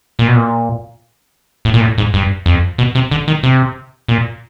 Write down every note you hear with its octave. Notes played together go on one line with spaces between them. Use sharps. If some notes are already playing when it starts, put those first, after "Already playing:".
A#2
B2
A#2
A2
A#2
A2
G#2
G2
F2
B2
C3
D3
D#3
C3
A#2